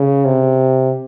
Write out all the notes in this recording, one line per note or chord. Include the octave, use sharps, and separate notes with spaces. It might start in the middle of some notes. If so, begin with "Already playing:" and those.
Already playing: C#3
C3